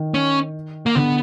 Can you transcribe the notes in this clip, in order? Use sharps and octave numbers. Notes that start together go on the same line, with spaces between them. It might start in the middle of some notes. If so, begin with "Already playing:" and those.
Already playing: D#3
C#4
A#3
D3 B3